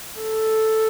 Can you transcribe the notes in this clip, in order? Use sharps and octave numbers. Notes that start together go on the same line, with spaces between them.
A4